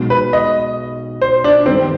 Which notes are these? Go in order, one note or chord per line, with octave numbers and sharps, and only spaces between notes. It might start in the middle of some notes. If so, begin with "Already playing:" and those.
Already playing: B1 B2 G#3
B4
D#5
C5
D4
G2 D#3 B3 C4 D#4